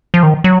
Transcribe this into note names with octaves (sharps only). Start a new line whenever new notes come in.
F3
D#3
F#3